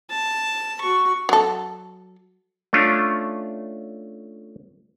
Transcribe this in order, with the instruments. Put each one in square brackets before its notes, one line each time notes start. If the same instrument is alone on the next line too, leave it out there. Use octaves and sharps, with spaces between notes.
[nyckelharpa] A5
F#4 C#6
[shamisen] F#3 A4
[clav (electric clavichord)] A3 C#4 D4 F4